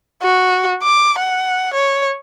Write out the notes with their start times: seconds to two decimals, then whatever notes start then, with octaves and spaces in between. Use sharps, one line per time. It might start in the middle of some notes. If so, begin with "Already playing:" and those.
0.22 F#4
0.83 D6
1.19 F#5
1.74 C#5